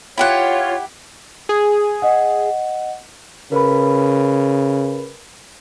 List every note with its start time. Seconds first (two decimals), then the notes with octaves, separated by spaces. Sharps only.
0.18 E4 F4 G4 C#5 F#5
1.49 G#4
2.02 D#5 F#5
3.52 C#3 A#4 B4 B5